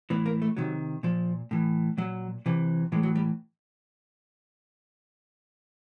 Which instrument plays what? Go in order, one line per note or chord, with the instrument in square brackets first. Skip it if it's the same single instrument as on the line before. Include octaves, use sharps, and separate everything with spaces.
[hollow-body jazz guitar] A2 E3 B3
A#3
A3
C3 D#3 F#3
A#2 F3
A2 E3
A#2 F#3
C3 E3
A2 E3 G#3
F#3
G3